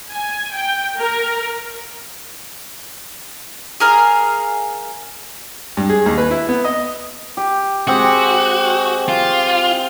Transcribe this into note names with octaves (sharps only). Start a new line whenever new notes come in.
G#5
G5
A#4
G#4 A#4 F5
G2
G#4
D#2
B4
E4
B3
D#5
G4
G#3 C4 F#4 G4
F4